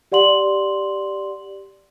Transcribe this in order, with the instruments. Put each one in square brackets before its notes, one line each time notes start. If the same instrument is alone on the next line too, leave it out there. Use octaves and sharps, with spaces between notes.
[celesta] G4 D5 F#5 C6 F#7